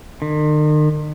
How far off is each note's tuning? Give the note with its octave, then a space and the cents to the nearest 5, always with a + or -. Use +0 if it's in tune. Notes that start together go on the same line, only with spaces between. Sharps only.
D#3 -45